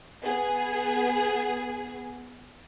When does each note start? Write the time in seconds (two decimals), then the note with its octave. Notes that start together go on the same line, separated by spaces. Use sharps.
0.22 B3 G#4